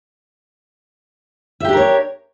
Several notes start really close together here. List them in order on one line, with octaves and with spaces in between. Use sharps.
E5 G4 D4 A#4 C#5